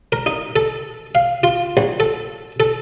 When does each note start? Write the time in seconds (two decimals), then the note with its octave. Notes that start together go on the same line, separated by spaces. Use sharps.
0.12 A#4
0.26 D#4
0.56 A4
1.15 F5
1.43 F4
1.77 A#1
2.00 A4
2.60 A4